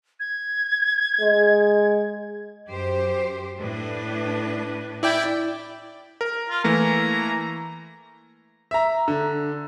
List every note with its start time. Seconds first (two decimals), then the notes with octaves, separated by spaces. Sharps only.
0.20 G#6
1.21 G#3
2.68 F#2 G4 C5
3.58 A2 D4 B4
5.03 E4 D5 G5
6.21 A#4
6.50 F4
6.64 E3 A3 A#3 A#5
8.71 E5 A#5
9.08 D3